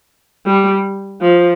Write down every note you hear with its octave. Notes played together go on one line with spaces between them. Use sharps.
G3
F3